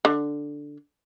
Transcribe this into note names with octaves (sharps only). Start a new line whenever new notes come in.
D3